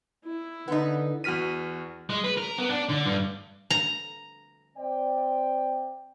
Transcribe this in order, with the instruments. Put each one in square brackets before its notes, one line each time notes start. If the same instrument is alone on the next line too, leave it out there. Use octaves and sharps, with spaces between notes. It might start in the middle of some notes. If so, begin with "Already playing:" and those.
[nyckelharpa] E4
[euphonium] D3 [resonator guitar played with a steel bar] B3 D#4
[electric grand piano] E2 F#4 F6 B6 D#7
[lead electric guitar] G#3
B4
A#4
B3
D4
D3
G2
[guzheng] A#5
[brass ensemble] C4 D5 G5